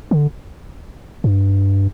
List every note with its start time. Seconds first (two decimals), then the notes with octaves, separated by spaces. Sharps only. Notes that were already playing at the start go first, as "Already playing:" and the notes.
0.11 D3
1.24 G2